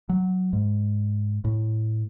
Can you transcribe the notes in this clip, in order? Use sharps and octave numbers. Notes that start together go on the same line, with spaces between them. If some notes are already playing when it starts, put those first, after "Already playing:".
F#3
G#2
A2